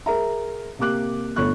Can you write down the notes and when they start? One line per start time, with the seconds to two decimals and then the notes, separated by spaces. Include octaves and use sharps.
0.06 G#4 A#4 E5 A#5
0.79 C3 A#3 G4 D6 F#6
1.36 G1 A3 B3 C#5 C#6 F#6